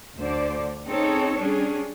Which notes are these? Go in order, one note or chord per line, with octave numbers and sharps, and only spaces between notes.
D2 D3 C5 D5
C4 C#4 D#4 G#4 A4 C#5
G3 C#4 D4 G#4